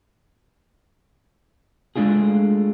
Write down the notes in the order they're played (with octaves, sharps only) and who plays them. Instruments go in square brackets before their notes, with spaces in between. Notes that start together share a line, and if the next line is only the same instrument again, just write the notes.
[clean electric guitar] G#3 A3 D4 F4 G#4